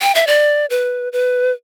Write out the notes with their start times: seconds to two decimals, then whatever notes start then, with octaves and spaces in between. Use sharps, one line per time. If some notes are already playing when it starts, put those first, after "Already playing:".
0.02 G5
0.15 E5
0.27 D5
0.70 B4
1.13 B4